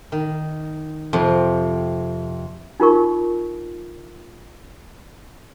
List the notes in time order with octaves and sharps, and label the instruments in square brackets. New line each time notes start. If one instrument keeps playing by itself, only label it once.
[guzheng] D#3
F2 C3
[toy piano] D#4 F4 A#4 C#6